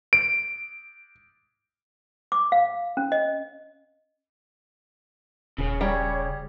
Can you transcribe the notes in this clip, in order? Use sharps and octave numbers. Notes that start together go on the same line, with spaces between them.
D7
D6
F5
C#4
D#5
D#1 C#3
G3 C#5 G5 A#5